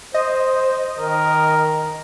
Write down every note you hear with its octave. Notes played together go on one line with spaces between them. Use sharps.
C5 D#5
D#3 A#4